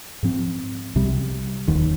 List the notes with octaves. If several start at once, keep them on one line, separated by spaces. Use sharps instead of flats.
G#2 F3 C4
C2 C3 G3
F1 D#2 D#3